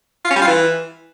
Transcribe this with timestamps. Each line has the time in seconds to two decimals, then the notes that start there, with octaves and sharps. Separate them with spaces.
0.25 F4
0.30 C#4
0.36 G3
0.42 F4
0.47 E3